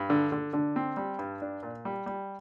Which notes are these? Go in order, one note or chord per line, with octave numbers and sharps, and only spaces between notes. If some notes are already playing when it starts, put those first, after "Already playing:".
Already playing: G2
D3 D4
D3
D3 D4
C4
G3
G2
D4
A#2
G3
G3